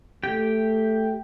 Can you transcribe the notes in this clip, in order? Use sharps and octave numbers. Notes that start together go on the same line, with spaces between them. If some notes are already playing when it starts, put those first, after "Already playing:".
A3 G4 G5